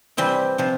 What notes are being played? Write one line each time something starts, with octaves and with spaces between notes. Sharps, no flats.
C3 E3 G3 C4
C3 F3